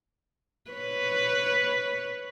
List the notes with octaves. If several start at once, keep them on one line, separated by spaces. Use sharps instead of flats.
B4 C#5